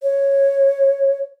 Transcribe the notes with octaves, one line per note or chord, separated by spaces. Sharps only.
C#5